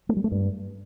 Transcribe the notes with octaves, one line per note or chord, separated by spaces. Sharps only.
A3
G3
A3
G2